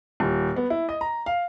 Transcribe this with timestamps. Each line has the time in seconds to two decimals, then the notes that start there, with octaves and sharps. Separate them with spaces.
0.20 D#1
0.56 B3
0.70 E4
0.89 D#5
1.01 A#5
1.26 F5